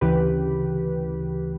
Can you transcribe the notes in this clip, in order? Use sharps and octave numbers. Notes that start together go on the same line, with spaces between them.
D2 C#3 E3 G4 B4